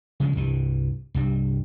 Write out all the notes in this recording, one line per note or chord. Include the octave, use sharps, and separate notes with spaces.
C#3 F3 G#3
C2 G2 E3 G3
C2 G2 G3